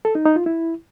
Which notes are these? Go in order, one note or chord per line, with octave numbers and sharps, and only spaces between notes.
A4
D#4
D#4
F4
E4